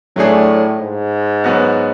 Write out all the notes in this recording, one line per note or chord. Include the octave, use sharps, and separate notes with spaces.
A2 F#3 A3 D4 G#4
G#2
F#3 B3 F#4